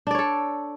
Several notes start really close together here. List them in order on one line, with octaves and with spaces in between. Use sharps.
D4 D5 C#5 A4